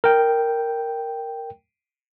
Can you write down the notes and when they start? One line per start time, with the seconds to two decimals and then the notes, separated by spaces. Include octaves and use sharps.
0.04 A#4 G5